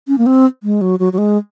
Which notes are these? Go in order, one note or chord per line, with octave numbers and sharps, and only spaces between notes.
C#4
A#3
C4
G#3
F#3
F#3
F#3
G#3